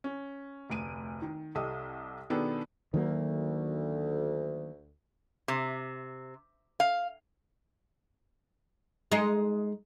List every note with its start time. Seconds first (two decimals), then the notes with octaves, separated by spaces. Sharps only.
0.04 C#4
0.69 F1 D2 D7 D#7
1.22 D#3
1.55 C2 G4 A4 D#5 D#6
2.30 B2 D#3 B3 D4 G#4 A4
2.94 D2 D#3 F#3 A#3
5.48 C3
6.80 F5
9.12 G#3 D#4